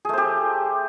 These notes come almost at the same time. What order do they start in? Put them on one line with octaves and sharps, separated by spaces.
G#4 A3 C5 G4